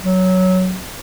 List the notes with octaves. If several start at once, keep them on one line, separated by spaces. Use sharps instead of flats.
F#3